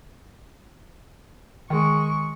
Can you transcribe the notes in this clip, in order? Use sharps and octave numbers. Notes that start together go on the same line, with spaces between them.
D#3 G#3 C#6